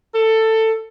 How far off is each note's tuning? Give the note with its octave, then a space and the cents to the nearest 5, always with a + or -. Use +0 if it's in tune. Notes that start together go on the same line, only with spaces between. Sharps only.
A4 +15